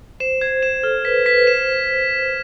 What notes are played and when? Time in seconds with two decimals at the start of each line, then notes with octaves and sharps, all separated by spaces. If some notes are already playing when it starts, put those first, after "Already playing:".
0.20 C5 E7
0.41 C5 G#6
0.63 C5 E7
0.83 A4 F6
1.05 B4 B6
1.26 B4 B6
1.47 C5 E7